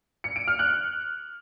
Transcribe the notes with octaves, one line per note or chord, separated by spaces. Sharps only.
C#7
D7
F6
F#6